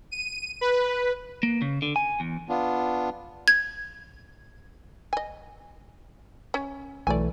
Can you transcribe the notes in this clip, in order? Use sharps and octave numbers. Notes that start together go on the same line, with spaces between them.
D#7
B4
A#3
C#3
D3
G#5
E2
B3 D4 F4
G#6
D#5 G#5
C#4
B1 E3 A3 D5 G#5